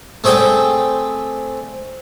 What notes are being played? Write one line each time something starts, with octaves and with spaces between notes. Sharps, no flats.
A3 C4 G#4 D5 G5